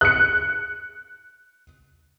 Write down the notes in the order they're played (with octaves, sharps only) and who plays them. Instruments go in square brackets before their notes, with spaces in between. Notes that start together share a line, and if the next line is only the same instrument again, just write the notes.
[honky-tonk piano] F#6 C#7